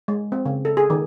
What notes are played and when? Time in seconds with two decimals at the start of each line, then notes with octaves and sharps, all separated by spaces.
0.08 G#3
0.32 C4
0.45 C#3
0.65 A4
0.77 G#4
0.90 D#3